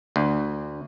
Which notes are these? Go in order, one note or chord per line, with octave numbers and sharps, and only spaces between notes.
D2